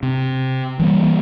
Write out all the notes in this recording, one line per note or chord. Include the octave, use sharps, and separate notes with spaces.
C3
E3 G3 A#3